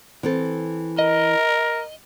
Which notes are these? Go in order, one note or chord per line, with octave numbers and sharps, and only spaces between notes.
E3 C4 A4
A#4 D#5